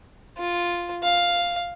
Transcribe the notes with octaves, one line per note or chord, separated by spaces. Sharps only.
F4
F5